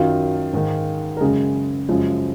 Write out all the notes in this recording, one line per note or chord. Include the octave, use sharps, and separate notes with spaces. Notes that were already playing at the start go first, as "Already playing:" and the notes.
Already playing: F#2 D#3 F#3 F4 F5
G#2 D#3 G#3
A#4
F#2 C#3 G#3 G#4
F#2 C#3 F3 G#3